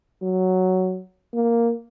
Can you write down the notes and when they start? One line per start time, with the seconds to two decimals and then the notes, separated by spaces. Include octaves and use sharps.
0.23 F#3
1.34 A#3